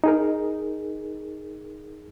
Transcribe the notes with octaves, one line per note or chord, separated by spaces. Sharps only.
D#4 G#4 A#4